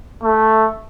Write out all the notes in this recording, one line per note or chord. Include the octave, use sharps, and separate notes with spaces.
A3